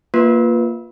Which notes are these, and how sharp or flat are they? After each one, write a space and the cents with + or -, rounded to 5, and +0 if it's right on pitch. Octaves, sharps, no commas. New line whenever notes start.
A#3 +0 F4 +0 B4 -5